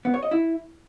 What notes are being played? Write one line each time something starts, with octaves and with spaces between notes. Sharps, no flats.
B3
C#5
D#5
E4